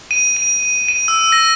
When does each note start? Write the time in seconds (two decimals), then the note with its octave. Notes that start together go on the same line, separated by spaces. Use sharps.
0.11 D#7
0.37 D#7
0.88 D#7
1.08 E6
1.32 A#6